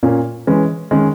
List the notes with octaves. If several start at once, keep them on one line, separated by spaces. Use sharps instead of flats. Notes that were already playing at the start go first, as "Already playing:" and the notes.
A#2 A#3 C#4
E3 G#3 C#4
D#3 G#3 C#4